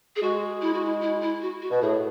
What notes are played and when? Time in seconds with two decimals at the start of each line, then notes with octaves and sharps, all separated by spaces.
0.16 G#4
0.22 G#3 F#4
0.62 E4
0.74 F#4
0.85 E4
1.02 E4
1.22 E4
1.42 F#4
1.62 F#4
1.71 B2
1.81 A2 G#4